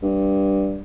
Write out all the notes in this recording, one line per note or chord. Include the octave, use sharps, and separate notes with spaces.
G2